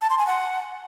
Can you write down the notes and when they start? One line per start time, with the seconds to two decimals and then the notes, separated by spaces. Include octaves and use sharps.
0.02 A5
0.10 C6
0.18 G#5
0.27 F#5